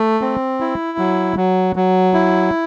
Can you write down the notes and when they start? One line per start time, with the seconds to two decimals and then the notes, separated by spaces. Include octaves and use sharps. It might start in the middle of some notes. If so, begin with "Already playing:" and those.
Already playing: A3
0.21 C4
0.61 E4
0.98 F#3
1.37 F#3
1.76 F#3
2.14 E4